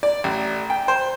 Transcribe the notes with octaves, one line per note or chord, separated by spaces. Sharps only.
D5
A1
G5
C5